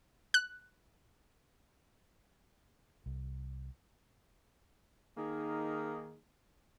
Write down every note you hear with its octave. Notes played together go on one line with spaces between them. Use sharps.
F#6
C2
D#3 A#3 D#4 G#4